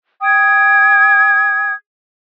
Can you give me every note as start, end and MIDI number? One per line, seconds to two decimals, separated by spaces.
0.22 1.73 79
0.22 1.73 87
0.22 1.73 92